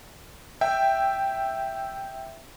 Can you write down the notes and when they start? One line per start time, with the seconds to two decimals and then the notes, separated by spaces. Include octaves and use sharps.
0.61 E5 G5